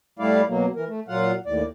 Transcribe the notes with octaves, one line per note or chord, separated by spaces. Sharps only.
A2 G3 A3 E4 D5 F5
B2 F#3 A#3
E3 A#4
A3
A#2 F#3 F4 F5 F#5
D#2 A2 D5